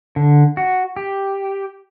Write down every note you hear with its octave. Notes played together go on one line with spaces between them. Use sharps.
D3
F#4
G4